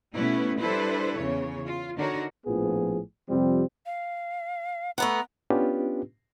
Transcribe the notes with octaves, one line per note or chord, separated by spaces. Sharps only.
B2 A3 B3 C#4 E4 B4
G3 D4 E4 A4 B4 C5
E2 C#3 C#5
F4
D3 D4 D#4 F#4 A#4 C#5
A#1 A2 F3 B3 G#4
F2 C3 F3 G3 C4
F5
A3 B3 F#5 A#5
B3 C#4 D4 F4 G4 B4